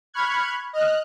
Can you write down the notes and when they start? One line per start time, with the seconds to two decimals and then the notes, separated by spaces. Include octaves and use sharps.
0.14 B5 C#6 F6 F#6 G#6
0.73 D#5 F6 F#6